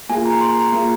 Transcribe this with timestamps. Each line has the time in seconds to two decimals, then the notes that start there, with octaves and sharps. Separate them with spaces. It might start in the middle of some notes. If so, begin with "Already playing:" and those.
0.09 A#3 F4 G#4 G#5
0.25 A#5
0.41 C6
0.57 A#5
0.72 A#3 F4 G#4